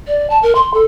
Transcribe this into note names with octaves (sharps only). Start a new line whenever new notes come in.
D5
A5
A#4
C6
A4